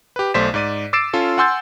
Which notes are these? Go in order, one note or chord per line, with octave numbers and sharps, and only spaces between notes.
G4 B4
B1 A3 C5 D5 B6 E7
G#2 D5 D#7
D6 E6 A6 C7 D7 E7
C#4 F4 A4
F#5 G#5 C6 E6 G6 A6